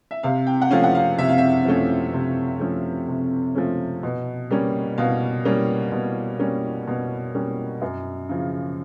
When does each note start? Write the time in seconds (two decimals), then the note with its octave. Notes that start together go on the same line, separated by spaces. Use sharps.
0.11 E5
0.23 C3 F5
0.47 G5
0.62 F#5
0.71 F3 A3 C#4 F5
0.84 F#5
0.95 F5
1.18 C3 E5
1.28 F5
1.38 E5
1.65 F3 A3 C#4
2.13 C3
2.60 F3 A3 C#4
3.08 C3
3.55 F3 A3 C#4
4.03 B2
4.51 G3 A#3 C#4
4.98 B2 F5
5.45 G3 A#3 C#4
5.92 B2
6.39 G3 A#3 C#4
6.87 B2
7.34 G3 A#3 C#4
7.82 F#2
8.29 C#3 F3